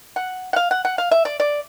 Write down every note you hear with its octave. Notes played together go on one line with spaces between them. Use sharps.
F#5
F#5
F5
F#5
F#5
F5
E5
D5
D5